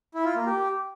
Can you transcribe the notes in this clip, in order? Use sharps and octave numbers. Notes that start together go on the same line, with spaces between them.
E4
F4
A#3
G4